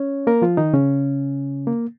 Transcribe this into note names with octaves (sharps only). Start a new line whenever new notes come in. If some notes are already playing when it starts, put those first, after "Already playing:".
Already playing: C#4 C#5
A#3 A#4
F3 F4
D#3 D#4
C#3 C#4
A#3